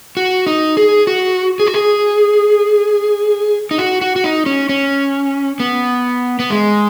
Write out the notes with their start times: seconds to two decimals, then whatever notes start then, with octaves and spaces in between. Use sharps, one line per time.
0.17 F#4
0.47 D#4
0.77 G#4
1.07 F#4
1.60 G#4
1.67 F#4
1.74 G#4
3.71 D#4
3.78 F#4
4.01 F#4
4.16 F#4
4.24 D#4
4.46 C#4
4.69 C#4
5.60 B3
6.40 B3
6.50 G#3